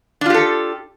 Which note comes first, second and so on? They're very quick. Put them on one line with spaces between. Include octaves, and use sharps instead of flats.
D4 F4 G4 A4